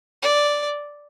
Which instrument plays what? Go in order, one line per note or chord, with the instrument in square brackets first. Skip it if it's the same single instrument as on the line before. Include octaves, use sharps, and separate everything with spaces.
[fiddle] D5